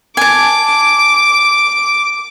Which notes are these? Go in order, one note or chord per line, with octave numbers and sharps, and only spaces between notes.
G#5 A5 D6